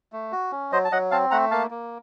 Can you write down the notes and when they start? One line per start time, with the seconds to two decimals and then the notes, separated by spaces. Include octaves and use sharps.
0.12 A3
0.32 F#4
0.52 C#4
0.72 F#3 C5 D#5
0.85 A5
0.92 F#3 D#5 F#5
1.11 C4 F5 A5
1.31 A3 F#5 A#5
1.51 A#3 F5 A5
1.70 A#3